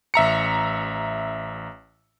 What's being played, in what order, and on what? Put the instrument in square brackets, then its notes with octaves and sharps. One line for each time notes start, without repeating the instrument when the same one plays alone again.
[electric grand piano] A1 E5 A#5 C#7